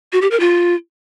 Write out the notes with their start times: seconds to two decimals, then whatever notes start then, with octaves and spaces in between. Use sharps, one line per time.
0.13 F#4
0.22 G4
0.31 A#4
0.40 F4